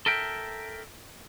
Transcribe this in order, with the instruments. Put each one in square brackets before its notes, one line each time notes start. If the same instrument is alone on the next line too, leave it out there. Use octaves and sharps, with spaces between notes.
[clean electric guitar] A4 A#4 E5 G5